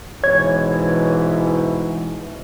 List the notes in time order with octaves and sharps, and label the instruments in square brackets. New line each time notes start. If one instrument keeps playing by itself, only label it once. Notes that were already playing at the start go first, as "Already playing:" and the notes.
[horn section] G#2 B2 E3 [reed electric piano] C#5 G#6